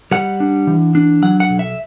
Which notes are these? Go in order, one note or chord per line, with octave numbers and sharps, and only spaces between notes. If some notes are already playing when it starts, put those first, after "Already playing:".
G3 F#5
D4
E3
D4
F#3 F#5
F#5
B1
E5